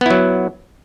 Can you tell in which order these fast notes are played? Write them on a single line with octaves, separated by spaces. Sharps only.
B3 E4 F#3